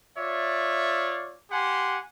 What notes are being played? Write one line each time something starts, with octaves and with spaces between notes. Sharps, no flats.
F4 C#5 D5 E5
G4 F#5 G#5 C6